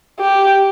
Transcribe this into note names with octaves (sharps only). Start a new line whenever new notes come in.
G4